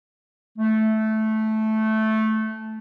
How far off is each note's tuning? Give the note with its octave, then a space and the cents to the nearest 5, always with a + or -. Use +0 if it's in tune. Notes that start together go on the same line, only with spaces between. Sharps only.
A3 -10